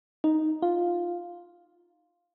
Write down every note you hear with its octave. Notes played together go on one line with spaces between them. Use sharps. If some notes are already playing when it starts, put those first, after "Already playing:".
D#4
F4